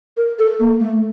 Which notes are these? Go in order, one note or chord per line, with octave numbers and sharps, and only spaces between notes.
A#4
A4
A#3
A3